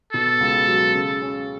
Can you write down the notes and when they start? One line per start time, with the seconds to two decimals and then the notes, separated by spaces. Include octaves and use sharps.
0.13 B2 A4
0.40 C#2
0.68 F#3
0.95 C#3
1.22 C#4